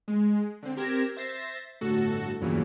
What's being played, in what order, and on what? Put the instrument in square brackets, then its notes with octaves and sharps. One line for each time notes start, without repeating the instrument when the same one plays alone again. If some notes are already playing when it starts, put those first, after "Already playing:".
[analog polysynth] G#3
D3 C4
C4 G4 A#4 G#6 A#6 E7
C5 E5 A6 A#6 C7
G1 A2 F#4 A4
E2 G2 A#2 C#3 E3 F#3